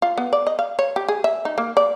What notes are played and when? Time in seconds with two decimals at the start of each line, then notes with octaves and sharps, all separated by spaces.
0.02 F4
0.18 B3
0.33 D5
0.47 D#5
0.59 F5
0.79 C#5
0.96 G4
1.08 G#4
1.24 E5
1.45 D#4
1.58 A#3
1.77 D5